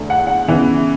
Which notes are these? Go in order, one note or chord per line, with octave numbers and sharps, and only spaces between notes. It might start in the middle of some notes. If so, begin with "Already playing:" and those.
Already playing: E2 D3 A3
F#5
F#5
C#3 E3 B3